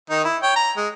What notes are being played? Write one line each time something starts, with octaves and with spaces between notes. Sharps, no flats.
D#3 D#4
E4
C#5 G5
A#5
G#3